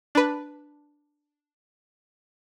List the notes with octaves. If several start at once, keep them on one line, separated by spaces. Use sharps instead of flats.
D4 B4